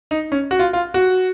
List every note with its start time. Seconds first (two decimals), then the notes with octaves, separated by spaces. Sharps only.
0.11 D#4
0.32 C#4
0.51 F#4
0.59 F4
0.73 F4
0.94 F#4